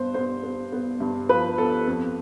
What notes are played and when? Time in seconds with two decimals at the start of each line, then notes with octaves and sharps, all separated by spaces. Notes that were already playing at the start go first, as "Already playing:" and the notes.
Already playing: G2 B3 C5
0.14 B3 C5
0.43 B3
0.72 B3
1.00 G2
1.29 F3 B4
1.58 B3 A4
1.87 F2